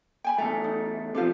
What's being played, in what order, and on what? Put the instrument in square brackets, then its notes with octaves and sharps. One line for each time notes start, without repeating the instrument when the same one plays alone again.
[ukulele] G5 G#5 B5
[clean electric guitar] E2 A3 [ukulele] A4 A#5
[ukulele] D#4
[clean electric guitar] C3 F3 [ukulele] D4 A4 F5